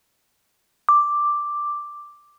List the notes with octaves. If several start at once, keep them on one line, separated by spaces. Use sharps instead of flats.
D6